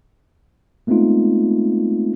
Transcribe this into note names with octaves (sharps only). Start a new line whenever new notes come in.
G#3 A3 B3 C4 D#4 F4